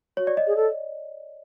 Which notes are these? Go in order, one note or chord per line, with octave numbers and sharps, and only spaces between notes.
F#4 C#5
D5
D#5
G#4
A4